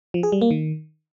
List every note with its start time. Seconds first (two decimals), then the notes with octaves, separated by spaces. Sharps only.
0.14 F3
0.23 G#4
0.32 G3
0.41 A#3
0.51 D#3